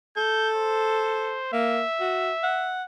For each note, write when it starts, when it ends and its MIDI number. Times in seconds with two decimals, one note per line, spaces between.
0.16 1.40 69
0.16 0.49 91
0.55 1.52 72
1.53 1.82 58
1.53 2.80 76
2.00 2.31 66
2.43 2.83 78